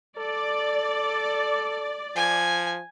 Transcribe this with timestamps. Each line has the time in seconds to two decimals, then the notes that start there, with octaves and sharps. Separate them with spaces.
0.18 A4 D5
2.16 F3 G#5